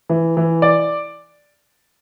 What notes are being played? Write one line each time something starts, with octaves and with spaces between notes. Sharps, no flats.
E3
E3
D5